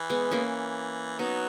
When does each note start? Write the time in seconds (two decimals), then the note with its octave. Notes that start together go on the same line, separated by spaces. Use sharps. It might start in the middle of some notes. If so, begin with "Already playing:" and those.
Already playing: E3
0.10 G#3 B3
0.31 A#3 C#4
1.19 F#3 B3 D#4